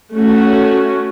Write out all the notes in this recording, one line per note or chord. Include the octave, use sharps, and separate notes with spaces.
A3 C#4 F#4